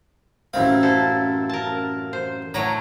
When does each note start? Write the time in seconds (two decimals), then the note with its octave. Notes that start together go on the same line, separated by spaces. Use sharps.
0.53 A1 F#2 C4 E4 E5 F5
0.83 E4 A4 C5
1.49 A#4 A5
2.13 C5
2.54 A2 F#3 A3 A#5